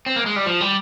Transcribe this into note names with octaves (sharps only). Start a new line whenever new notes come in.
C4
A#3
G#3
G3
F3
G3